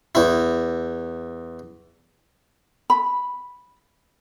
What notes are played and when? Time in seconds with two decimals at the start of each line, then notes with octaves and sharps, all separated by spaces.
0.15 E2 E4
2.90 B5